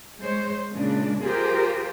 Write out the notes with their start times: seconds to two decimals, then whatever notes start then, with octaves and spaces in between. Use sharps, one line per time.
0.20 G#3 C5 C#5
0.72 A#2 C#3 G#3 D4
1.23 F4 G4 G#4 A#4 C5